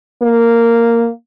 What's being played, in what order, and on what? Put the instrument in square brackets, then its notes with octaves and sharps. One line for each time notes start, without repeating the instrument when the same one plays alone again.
[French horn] A#3